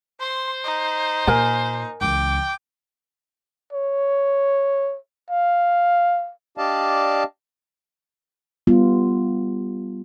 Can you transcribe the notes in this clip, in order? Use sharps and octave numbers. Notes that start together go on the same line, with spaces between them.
C5 C6
D#4
A#2 A#4 G#5
C#2 E3 G5 D6
C#5
F5
D4 G4 D5 D#5 F5 A5
G3 B3 F4